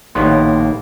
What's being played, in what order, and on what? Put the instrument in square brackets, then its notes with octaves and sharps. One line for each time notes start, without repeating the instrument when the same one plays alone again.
[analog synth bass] A#1 [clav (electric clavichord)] D#2 A2 B3 [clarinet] A#3 [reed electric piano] C#5 C6